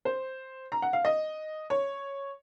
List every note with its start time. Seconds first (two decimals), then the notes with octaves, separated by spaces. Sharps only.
0.05 C5
0.72 A#5
0.82 F#5
0.93 F5
1.05 D#5
1.70 C#5